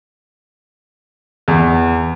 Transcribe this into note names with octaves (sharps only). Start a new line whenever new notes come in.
E2